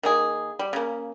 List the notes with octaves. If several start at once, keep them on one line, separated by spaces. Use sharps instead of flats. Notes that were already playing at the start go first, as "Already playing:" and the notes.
D#3 A#3 G#4
G3
C#3 A#3